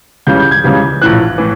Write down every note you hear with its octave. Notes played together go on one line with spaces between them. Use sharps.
C#2 C#3 E3 G3 G6
G6
G#6
C#2 C#3 E3 G3
A#1 A2 E3 F#6
A2 E3